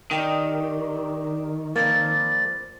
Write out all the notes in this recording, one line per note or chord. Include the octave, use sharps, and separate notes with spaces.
D#3 D4 D#4 G4
F3 A#3 C4 B4 D5